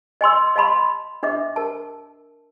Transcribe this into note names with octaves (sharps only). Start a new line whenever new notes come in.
D#5 G#5 C6 E6
D#5 F5 A5 B5 C6
D4 D#5 E5 D6
A#4 A5